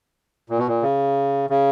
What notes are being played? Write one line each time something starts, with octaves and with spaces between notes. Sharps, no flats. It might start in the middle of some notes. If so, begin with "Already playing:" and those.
A#2
B2
A#2
C#3
C#3